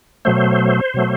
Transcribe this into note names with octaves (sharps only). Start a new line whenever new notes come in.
B2 F#3 A3 C5
B2 F#3 A3